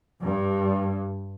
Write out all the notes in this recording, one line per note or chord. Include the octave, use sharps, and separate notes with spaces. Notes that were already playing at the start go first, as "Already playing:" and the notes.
G2